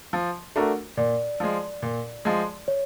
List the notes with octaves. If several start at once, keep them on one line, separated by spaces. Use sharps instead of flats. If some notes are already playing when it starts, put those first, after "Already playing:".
F3
A3 D4 F#4 A#4
A#2 D5
F3 G#3
A#2
F3 G#3
C#5